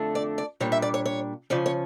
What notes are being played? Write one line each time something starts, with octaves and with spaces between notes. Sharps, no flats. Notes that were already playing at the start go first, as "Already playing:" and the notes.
Already playing: F2 D3 A3 D4
D5
D5
A#2 G3 D4 C#5
E5
D5
C#5
C#5
C#3 F3 C#4 D5
C#5